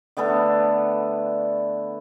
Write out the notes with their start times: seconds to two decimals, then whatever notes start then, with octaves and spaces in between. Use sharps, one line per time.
0.17 D3 A3 B3 A4